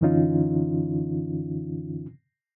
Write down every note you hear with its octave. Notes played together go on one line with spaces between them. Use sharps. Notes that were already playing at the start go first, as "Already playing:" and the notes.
F#2 D3 E3 C#4 D#4 F4